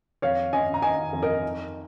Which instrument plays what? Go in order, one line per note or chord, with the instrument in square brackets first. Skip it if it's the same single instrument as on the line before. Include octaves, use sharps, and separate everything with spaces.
[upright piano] F2 C#5 F5
C#4 D#5 G#5
A#5
D#3 D#5 G#5
F2
A#4 D#5
D#4